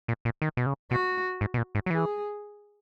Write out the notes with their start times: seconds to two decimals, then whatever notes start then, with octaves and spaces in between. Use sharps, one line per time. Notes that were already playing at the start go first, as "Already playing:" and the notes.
0.08 A#2
0.25 A#2
0.42 D#3
0.57 B2
0.66 C#3
0.91 B2 F#4
1.41 G#2
1.54 B2
1.58 A#2
1.75 G#2
1.86 F#3
1.90 E3 G#4